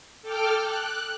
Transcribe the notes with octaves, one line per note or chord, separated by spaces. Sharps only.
A4 G5 D6 F6
F#6